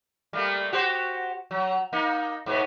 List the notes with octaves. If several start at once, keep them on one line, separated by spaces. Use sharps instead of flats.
G3 A3 A#3
F#4 G4 C5
F#3
A#3 D#4
G#2 B2 B3